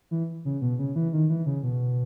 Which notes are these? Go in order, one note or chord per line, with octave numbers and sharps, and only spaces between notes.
E3
C#3
B2
C#3
E3
D#3
E3
C#3
B2